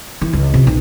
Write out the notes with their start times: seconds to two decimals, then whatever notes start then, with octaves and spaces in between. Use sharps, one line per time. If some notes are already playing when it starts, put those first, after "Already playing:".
0.21 E3
0.33 C#2
0.54 C3
0.67 B1